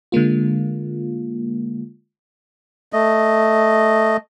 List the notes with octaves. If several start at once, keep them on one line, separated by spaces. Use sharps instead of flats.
D3 G#3 A#3 F4
A3 D#5